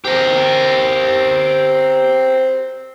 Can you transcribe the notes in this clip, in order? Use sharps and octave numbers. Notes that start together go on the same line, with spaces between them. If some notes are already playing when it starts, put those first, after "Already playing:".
C4 G4 A#4